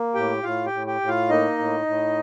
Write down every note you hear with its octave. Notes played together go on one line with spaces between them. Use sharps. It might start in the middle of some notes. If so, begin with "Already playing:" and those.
Already playing: A#3
A2 G4 G5
A2 F4 F5
G4 G5
A2
G4 G5
A2
F4 F5
A#3 D#4 D#5
A2
A2